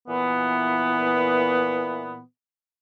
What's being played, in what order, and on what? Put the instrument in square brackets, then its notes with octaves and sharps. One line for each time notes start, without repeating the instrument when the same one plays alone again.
[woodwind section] A#2 E3 B3